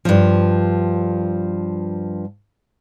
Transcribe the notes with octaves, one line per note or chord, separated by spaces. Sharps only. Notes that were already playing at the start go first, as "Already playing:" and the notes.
G2 F3